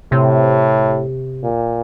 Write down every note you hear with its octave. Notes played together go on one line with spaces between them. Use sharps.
A2 C3
A#2